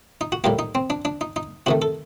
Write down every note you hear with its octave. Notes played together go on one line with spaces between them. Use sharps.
D#4
F#4
A2 G3 A#3 G4
D#4
C4
D4
D4
D#4
D#4
C3 D#3 A3 F#4
A4